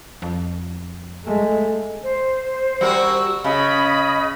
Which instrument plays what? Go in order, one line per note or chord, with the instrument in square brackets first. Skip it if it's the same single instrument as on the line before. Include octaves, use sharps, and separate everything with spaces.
[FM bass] F2
[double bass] G#3 A3
[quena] C5
[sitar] G3 F#4 A#4 [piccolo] E6
[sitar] C#3 [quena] D#5 [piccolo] B5